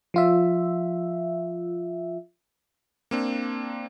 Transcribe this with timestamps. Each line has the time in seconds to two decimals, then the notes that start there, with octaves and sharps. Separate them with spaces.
0.14 F3 F4 E5
3.11 A#3 C4 D4